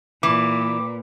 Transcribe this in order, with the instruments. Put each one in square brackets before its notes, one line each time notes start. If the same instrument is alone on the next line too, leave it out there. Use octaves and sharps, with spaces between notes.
[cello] A#2 [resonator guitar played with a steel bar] E3 [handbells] D6